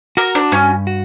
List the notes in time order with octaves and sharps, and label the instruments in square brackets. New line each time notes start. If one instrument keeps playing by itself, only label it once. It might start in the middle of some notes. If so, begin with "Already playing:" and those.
[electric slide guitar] F#4 [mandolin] A#4
[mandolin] D4
[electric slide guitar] G2 [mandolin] C#4
[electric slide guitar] F#4